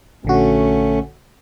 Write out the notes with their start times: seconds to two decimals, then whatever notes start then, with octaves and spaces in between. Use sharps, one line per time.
0.25 A#1 D3 A3 C#4 F#4